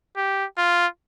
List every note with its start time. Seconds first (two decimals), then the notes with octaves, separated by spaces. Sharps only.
0.17 G4
0.58 F4